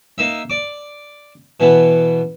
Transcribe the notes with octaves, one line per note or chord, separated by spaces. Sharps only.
A#3 D#4 E5
D5 D6
B2 E3 B3